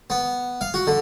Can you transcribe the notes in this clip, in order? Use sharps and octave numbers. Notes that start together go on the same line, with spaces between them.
B3
F5
F#4
D3